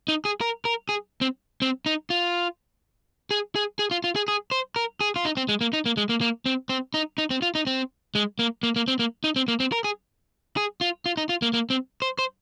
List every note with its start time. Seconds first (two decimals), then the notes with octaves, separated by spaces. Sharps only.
0.08 D#4
0.25 G#4
0.41 A#4
0.65 A#4
0.89 G#4
1.21 C4
1.62 C4
1.86 D#4
2.10 F4
3.31 G#4
3.56 G#4
3.79 G#4
3.91 F4
4.04 F4
4.16 G#4
4.28 G#4
4.51 C5
4.76 A#4
5.01 G#4
5.16 F4
5.25 D#4
5.37 C4
5.49 G#3
5.61 A#3
5.73 D#4
5.86 A#3
5.97 G#3
6.09 A#3
6.21 A#3
6.46 C4
6.69 C4
6.94 D#4
7.18 D#4
7.30 C4
7.42 F4
7.55 D#4
7.67 C4
8.15 G#3
8.39 A#3
8.63 A#3
8.76 A#3
8.88 C4
8.99 A#3
9.24 D#4
9.36 C4
9.48 A#3
9.60 C4
9.72 A#4
9.84 G#4
10.57 G#4
10.81 F4
11.06 F4
11.17 D#4
11.29 F4
11.42 A#3
11.53 A#3
11.70 C4
12.02 C5
12.19 C5